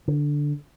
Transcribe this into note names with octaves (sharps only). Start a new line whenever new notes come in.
D3